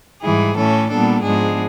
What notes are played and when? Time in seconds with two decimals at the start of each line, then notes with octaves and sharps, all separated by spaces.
0.22 G#2 E3 G3 G#4
0.56 A2 E3 A3 C#4 A4
0.89 A#2 G3 B3 D4 A4
1.24 G#2 F3 G#3 B3 D4 G#4